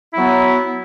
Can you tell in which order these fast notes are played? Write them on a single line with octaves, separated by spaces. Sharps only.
E4 F#3 B3